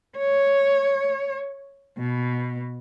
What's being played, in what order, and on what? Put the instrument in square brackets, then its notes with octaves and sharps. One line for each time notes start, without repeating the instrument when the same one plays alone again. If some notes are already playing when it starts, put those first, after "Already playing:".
[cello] C#5
B2